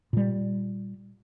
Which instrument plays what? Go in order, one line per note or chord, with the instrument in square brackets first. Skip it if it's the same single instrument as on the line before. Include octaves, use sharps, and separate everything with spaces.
[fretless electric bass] A#2 G3